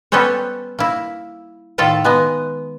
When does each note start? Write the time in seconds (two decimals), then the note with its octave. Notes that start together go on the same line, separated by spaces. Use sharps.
0.12 G3 B3 C#4 A4 C5 C#5
0.79 A#3 E4
1.78 A2 D#3 F4 A4 E5 A5
2.04 G#3 B3 D#5